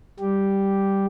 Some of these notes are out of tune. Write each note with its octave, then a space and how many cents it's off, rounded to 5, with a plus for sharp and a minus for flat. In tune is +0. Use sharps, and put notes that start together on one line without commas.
G3 +0 G4 -5